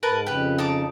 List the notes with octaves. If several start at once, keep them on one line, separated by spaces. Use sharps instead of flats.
G#2 A#4 B4 A5
F2 C#3 G4 B4
D#4 A5 D6